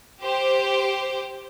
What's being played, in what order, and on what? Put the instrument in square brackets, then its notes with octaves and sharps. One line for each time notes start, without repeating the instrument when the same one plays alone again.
[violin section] G4 C5